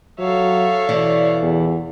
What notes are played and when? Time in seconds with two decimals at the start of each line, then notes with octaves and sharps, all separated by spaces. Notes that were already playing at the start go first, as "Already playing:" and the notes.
0.19 F#3 A4 C#5 E5 F5
0.89 B2 E3 D5
1.42 E2